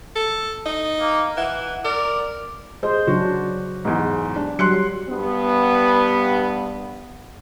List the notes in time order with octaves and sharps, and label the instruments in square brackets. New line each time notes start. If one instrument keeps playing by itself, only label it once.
[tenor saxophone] A4
D#4
[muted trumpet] A#3
[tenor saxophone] E3 [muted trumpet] F#5
[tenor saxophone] A#4 [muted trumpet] D5
[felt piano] G#3 D#5 [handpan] C5
[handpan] C#3 F#3 D4 [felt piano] F#4
[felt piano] E2 G#2
D4
[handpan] F#3 G3 [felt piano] C6 F#6 C#7
[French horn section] G2 B3